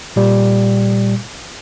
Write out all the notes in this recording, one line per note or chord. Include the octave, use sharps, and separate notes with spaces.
A#2 G3